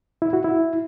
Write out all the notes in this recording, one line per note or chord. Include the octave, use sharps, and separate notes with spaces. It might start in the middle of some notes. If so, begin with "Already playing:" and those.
E4
F#4
E4